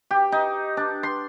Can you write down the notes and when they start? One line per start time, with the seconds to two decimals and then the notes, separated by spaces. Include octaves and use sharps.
0.11 G4
0.32 D#4
0.77 D4
1.03 C6